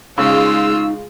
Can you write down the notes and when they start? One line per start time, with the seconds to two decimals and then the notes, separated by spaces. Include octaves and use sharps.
0.18 C#3 G#3 D#4 F4 E6